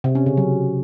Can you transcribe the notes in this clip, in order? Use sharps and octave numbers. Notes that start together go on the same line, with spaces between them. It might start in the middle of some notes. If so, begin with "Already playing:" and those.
C3
C#4
C#3
F#3